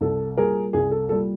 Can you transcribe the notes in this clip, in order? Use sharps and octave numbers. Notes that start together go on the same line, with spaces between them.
C2 A4
A#2 G3 G#4 A#4
C2 G#4
A4
A#2 G3 A4